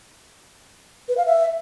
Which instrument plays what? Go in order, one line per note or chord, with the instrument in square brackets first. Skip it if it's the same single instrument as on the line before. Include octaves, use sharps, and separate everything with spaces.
[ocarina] B4
F5
E5